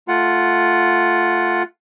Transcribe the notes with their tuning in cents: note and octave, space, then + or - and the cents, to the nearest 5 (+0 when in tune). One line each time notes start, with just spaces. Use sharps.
A3 -5 F4 +0 F#5 +0